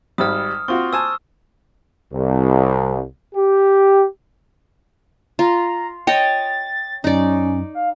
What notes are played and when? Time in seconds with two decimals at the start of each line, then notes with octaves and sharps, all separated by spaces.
0.18 G#1 G3 D#6 F6
0.68 C4 F4 F#4 C#6
0.93 C5 G#5 A5 E6
2.14 C2
3.35 G4
5.39 F4 A#5
6.07 C#5 D#5 G5 A6
7.04 F#2 C#4 D#4 D5
7.75 F5